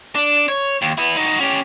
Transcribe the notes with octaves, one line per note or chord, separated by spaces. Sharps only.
D4
C#5
D#2
B3 E4
D#4 F#4
C#4 G4